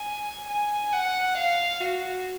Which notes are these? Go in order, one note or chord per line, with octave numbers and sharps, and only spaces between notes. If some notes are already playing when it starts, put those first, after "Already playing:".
Already playing: G#5
G#5
F#5
F5
F#4